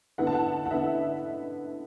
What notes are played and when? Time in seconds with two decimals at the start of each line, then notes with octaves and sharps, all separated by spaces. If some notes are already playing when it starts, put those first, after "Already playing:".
0.18 D3 B3 E4 F#5
0.27 A5
0.34 F#5
0.66 F#5
0.71 D3 B3 E4 E5